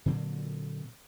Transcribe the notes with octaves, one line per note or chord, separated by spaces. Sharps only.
A#2 D3 F#3 C4